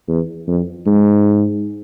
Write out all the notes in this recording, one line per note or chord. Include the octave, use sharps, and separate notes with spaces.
E2
F2
G#2